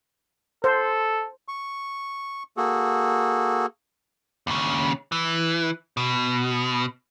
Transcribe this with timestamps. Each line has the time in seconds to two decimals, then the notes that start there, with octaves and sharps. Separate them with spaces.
0.64 A4 C5
1.48 C#6
2.57 A#3 F#4 G#4 A4
4.47 D#2 C#3
5.12 E3
5.97 B2